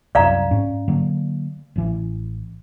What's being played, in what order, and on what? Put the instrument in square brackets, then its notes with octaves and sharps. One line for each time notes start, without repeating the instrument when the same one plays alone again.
[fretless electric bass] C2 F#2 [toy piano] D5 F5 A#5
[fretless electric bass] G#2 C#4
D3 F#3 A#3
A1 E3